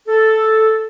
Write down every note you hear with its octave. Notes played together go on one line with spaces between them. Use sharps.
A4